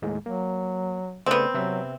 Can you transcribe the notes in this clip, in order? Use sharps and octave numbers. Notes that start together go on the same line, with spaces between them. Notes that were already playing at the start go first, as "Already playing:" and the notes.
D#2 A2 G#3
F#3 A#3
C#3 A3 B3 C4 D5
C3 F#3 B4 E5